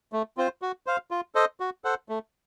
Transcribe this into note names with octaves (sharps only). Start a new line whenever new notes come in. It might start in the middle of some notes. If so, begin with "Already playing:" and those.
A3
C4 F4 C5
F#4
C5 F5
F4
A4 C5 D#5
F#4
A4 C5 F#5
A3